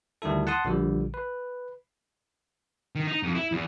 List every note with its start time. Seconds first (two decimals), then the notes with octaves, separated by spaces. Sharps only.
0.22 D2 D#3 G3 E4 A4
0.47 F#5 A5 C6 D#6
0.65 A#1 D3 F3 G3
1.14 B4
2.95 D#3
3.07 D#4
3.23 F2
3.35 E4
3.52 E2